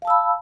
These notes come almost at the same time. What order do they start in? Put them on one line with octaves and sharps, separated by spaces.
F5 A5 E6 B5